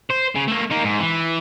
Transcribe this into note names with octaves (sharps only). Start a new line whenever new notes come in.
C5
C#3
A3 A#3
A#3 D#4
G#2
E3